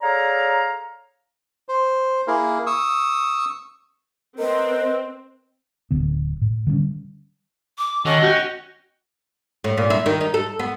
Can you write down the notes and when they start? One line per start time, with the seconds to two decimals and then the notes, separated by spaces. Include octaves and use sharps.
0.02 G#4 A4 C#5 D5 F5 A#5
1.69 C5
2.27 A#3 E4 G#4 A#4
2.67 C#6 D#6 E6
4.39 C4 A#4 B4 D#5
5.91 D1 D3 B3
6.42 A2
6.67 D3 G3 B3 C#4
7.78 D6
8.05 D#3 C#4 F#4 A4 D#5
8.22 C#4 F#4 F#5 G5 F#6
9.64 A2
9.77 A#2
9.90 E4
10.06 D#3
10.21 D#4
10.34 A4
10.59 B3